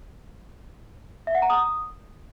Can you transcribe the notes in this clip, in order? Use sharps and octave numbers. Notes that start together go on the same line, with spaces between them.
E5
F#5
A#5
D#6